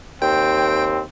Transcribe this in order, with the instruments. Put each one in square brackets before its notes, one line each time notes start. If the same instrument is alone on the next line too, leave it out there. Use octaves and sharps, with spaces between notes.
[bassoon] D#2 [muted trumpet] C4 [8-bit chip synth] G5